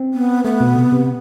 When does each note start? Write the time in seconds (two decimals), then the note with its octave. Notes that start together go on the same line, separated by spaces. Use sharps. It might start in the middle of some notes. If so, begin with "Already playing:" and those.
Already playing: C4
0.14 B3
0.44 A3 B3
0.61 B2
0.76 C3
0.92 C3